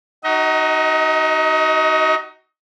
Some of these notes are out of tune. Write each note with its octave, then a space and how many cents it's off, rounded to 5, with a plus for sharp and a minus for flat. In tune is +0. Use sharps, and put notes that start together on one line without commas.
D#4 -5 F#4 +20 D#5 +30